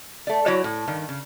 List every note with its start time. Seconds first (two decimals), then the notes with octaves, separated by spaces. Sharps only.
0.27 A3 D5
0.46 F#3 E4 F#4 C#5 D5
0.64 A2
0.88 G2 D#3
1.09 C#3